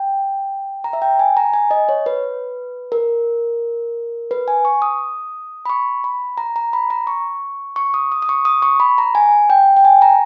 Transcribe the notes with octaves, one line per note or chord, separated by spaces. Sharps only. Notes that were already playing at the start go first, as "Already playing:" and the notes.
Already playing: G5
A#5
E5
G5
G#5
A#5
G#5
D#5
C#5
B4
A#4
B4
G#5
C#6
D#6
B5
C#6
B5
A#5
A#5
B5
A#5
C#6
C#6
D#6
D#6
D#6
C#6
D#6
C#6
B5
A#5
G#5
G5
G5
G#5
A#5